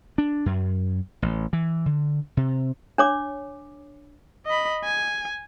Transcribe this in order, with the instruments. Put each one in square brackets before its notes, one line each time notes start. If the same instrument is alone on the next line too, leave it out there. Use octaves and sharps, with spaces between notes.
[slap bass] D4
F#2
A1
E3
D3
C3
[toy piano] D4 C#5 D6
[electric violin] D#5 B5
G#5